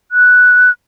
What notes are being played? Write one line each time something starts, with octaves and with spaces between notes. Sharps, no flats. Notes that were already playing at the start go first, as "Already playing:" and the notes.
F#6